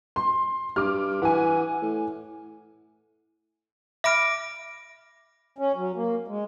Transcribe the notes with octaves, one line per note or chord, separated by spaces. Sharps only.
C6
G2 D6 F6
E3 F#5 G#5
A2
E5 B5 D6 F6 A#6 D7
C#4
F#3
A#3
G#3